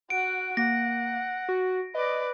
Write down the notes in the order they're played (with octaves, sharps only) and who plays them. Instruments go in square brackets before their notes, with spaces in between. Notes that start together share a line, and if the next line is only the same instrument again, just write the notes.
[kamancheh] F#4 F#5 [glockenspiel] D7
[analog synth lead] A#3 [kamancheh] F#5 [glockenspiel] A#6
[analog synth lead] F#4
[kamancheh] B4 D5 [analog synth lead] D#5